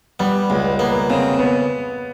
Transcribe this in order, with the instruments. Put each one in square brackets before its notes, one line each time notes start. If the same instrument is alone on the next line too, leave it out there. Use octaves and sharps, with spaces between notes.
[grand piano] G3 [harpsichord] B3
[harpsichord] C#2 [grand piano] G#3
[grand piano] A#3 [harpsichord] B3
[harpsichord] C#3 [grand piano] C4
[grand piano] B3